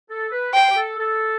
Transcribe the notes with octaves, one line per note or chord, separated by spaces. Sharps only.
A4
B4
C5 G5
G4
A4
A4